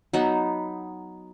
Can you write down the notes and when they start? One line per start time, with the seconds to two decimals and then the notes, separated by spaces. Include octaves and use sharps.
0.13 F#3 B3 D#4